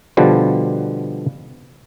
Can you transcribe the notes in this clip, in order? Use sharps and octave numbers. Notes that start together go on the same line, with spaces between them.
B2 D3 F3 G3